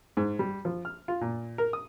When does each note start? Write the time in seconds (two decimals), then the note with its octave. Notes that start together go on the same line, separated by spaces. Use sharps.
0.17 G#2
0.39 G3
0.65 F3
0.85 F6
1.08 F4
1.21 A#2
1.58 A#4
1.73 D#6